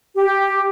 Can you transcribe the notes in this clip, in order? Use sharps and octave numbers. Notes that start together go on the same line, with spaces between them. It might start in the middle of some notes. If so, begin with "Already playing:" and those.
G4